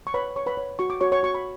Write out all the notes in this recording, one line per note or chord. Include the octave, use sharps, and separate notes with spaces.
C#6
B4 C#5 B5
C#5 C#6
B4 B5
C#5
F#4 C#6
D6
F#4 C#5 C#6
C#5 C#6
F#4 C#6
B5